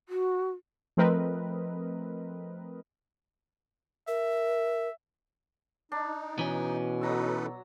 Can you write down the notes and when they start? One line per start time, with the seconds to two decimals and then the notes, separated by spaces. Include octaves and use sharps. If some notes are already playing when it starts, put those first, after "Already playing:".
0.09 F#4
0.97 F3 A3 C4 A#4 B4 D#5
4.08 A#4 E5
5.92 D4 D#4
6.39 B2 E3 C#4
7.01 F#3 D#4 A4 B4 A#5 E6